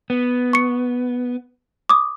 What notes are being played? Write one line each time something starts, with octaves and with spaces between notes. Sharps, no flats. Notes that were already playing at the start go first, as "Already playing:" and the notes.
B3
C#6 C#7
D6 D#6